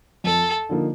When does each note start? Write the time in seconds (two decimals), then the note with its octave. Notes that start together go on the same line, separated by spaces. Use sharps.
0.24 F2 A4
0.69 D3 F3 A#3 D#4